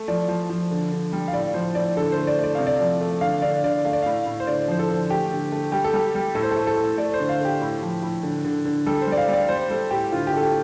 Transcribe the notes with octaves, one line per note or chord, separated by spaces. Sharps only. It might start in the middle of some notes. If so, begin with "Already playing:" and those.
Already playing: A3
F3 D5
F3
F3
D3
D3
G3
F5
A2 D5
F3 C5
A2 D5
D3 A4
C5
A3
D5
A3 D5
C3 F5
D5
F3
A3
D3 F5
D3 D5
D3 D5
A3 F5
D5
A2 F5
A2
C5
D3 D5
F3 C5
A4
D3
A3 G4
D3
A3
G3 G4
A4
G3 G4
G3
A2 A4
C5
A3 A4
A4
A2
A3 D5
C5
D3
F5
A3 G4
A2
F3
A2
D3
D3
D3
G3 A4
C5
G3
D5
F5
G3 D5
G3 C5
G3 A4
A2 G4
D3 F4
G4
A3 A4
G4